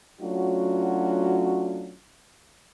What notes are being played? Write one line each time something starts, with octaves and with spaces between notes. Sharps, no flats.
F#3 A3 C#4 D4 F4 F#4